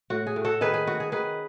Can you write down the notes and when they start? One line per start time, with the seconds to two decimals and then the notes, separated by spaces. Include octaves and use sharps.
0.10 A2 F#4
0.27 G#4
0.36 A2
0.45 F#4 A4
0.61 D#3 G#4 B4
0.74 G#4
0.87 C#4 F#4
1.00 G#4
1.12 D#3 G#4 B4